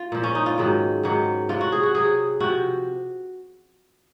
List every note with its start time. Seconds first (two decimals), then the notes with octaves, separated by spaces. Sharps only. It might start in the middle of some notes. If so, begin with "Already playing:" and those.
Already playing: F4
0.12 A#2 F3
0.24 C#4
0.35 D#4
0.46 F4
0.58 G#2 D#3 F#3
1.03 G#2 D#3 F#3
1.49 C3 F#3 F4
1.61 F#4
1.72 G#4
1.83 F#4
1.95 C3 F#3 G#4
2.40 C3 F3 F#4